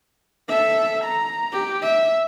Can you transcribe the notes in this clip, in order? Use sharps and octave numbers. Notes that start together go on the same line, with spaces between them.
A4 E5
A#5
G4
E5